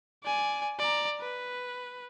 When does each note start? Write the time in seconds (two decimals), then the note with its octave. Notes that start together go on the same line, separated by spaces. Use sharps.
0.23 D5 G#5
0.79 D5 A#5
1.20 B4